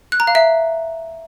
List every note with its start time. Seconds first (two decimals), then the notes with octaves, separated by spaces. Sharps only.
0.12 F#6
0.20 A#5
0.27 F5
0.35 E5